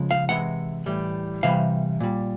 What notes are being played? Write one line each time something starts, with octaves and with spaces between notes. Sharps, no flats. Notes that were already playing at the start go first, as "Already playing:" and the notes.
Already playing: C#3 F3 G#3
F5
C3 E3 G#3 F#5
A2 E3 G3
C3 E3 G3 F5
A#2 G3